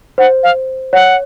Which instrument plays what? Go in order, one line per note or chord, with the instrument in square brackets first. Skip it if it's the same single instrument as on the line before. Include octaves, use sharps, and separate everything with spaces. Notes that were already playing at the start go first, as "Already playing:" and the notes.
[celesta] C5 [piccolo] F#5
[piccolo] F5
[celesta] C#5 [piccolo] F#5